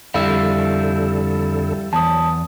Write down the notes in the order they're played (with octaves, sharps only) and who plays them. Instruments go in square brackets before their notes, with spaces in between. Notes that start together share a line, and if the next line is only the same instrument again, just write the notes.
[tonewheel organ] F2 D3 A4 [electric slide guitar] G3 E4 [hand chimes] F5 E6
[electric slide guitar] E2 [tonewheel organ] F#3 [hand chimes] A5 D#6